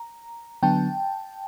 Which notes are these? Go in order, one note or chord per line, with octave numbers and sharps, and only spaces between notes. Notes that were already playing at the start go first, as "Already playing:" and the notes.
Already playing: A#5
D3 F#3 B3 D4 G5 A5